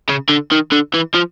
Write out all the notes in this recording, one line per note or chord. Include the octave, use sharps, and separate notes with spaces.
C#3
D3
D#3
D3
E3
F3